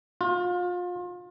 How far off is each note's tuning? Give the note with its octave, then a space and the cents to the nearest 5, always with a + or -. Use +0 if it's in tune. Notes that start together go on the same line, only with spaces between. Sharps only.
F4 +30